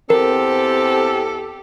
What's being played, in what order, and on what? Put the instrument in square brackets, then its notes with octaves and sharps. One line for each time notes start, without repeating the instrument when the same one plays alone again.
[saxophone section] E2 A4 [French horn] C4 [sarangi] G4 [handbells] A#4